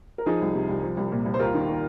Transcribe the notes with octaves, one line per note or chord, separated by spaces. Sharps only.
A#4
F3 D#4 G#4
C2
C3
C2
F3
C2
A#2
C2
C5
D#2 F4 A#4
D#3
D#3